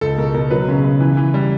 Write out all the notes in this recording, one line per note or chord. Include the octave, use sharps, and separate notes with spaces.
C#2 A4
B2 A#4
B2 A#4
F#3 B4
C#3
C#3
E3
E3
G3